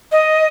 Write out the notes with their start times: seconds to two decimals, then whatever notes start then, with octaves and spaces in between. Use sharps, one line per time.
0.12 D#5